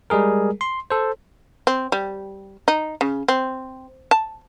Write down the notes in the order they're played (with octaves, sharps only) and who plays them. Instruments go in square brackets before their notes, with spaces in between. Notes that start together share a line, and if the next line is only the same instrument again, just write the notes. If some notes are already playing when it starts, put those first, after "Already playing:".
[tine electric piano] G3 G#3 G#4 A#4
C6
A4 C5
[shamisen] C4
G3
D#4
C#3
C4
A5